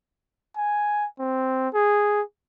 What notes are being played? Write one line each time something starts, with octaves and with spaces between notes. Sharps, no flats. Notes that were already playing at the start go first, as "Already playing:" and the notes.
G#5
C4
G#4